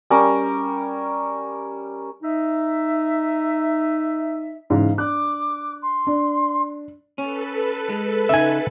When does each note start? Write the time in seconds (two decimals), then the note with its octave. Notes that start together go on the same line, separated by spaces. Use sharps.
0.10 G3 C#4 A#4
2.23 D#4 E5
4.70 G#2 C#3 E3 F5
4.98 D4 D6 F#6
5.82 C6
6.07 D4
7.18 C#4 A4 B4
7.89 G#3
8.29 C#3 D#4 E5 G#5